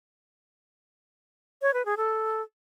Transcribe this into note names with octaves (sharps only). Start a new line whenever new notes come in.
C#5
B4
G#4
A4